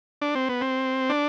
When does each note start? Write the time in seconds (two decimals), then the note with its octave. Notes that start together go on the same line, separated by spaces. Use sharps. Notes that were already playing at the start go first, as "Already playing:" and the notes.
0.22 D4
0.35 C4
0.49 B3
0.61 C4
1.10 D4